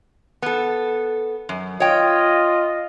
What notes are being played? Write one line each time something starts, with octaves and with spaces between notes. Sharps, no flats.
B3 A4
F#2
F4 C#5 D#5 G5